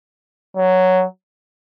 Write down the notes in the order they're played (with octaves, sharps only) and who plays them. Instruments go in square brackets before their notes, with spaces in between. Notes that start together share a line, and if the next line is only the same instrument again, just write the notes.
[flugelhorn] F#3